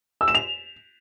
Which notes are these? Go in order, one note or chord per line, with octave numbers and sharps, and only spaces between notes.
E6
E7
F7